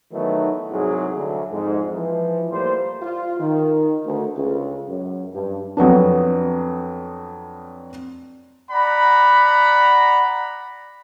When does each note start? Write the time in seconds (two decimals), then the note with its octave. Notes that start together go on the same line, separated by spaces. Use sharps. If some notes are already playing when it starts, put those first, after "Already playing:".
0.11 D#3 E3 F#3 A3 B3 D#4
0.71 C2 G#2 F#3 G#4
1.15 D2 F#3
1.49 F2 G#2
1.93 E3 F3
2.50 A2 G3 A#3 C5
3.02 F4
3.39 D#3
4.05 D2
4.36 C#2
4.88 F#2
5.33 G2
5.77 F2 F#3 B3 D4
8.71 D5 F#5 A#5 B5